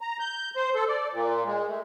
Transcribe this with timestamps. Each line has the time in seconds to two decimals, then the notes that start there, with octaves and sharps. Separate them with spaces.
0.01 A#5
0.20 G6
0.56 C5
0.75 A4
0.89 D5
1.13 A#2
1.46 G#3
1.69 A3